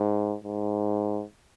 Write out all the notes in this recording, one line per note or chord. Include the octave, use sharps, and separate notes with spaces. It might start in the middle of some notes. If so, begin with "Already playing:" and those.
Already playing: G#2
G#2